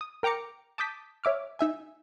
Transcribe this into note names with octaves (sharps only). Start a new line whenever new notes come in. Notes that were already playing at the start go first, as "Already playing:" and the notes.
D#6
A#4 G5 A#5 D6 C#7
A5 D6 D#6 G6 B6
C#5 E5 D6 F6
D#4 E5 G#5